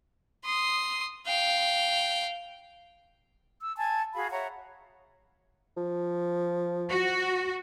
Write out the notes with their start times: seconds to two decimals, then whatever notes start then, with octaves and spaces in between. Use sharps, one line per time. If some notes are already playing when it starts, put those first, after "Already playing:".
0.45 C6 D#6
1.27 F5 G5
3.62 E6
3.77 G#5 A5
4.15 F#4 G#4 F5 B5
4.31 C#5 E5 F#5 A#5
5.77 F3
6.89 F#4